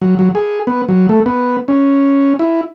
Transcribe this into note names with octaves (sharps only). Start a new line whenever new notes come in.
F#3
F#3
G#4
B3
F#3
A3
B3
C#4
E4